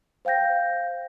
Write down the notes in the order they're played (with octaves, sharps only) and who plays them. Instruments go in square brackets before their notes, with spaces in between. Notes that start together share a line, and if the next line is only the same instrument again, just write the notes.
[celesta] C5 F5 G5 G6 A#6